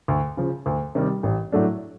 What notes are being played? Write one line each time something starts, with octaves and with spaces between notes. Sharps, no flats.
D2
C#3 F3
D2
C3 D#3 G3
A1
A2 F#3 A3 D4